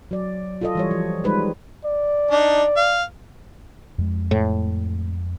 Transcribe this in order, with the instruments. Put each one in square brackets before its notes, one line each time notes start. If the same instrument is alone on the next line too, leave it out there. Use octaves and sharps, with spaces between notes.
[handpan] F#3 D5
F4 A4 D#5
E3 G3 C#5
F3
G3 G#3 D#4 B4 C5
[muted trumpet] D5
[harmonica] D4 D#4
F5
[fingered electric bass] F2 G#3
[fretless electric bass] A2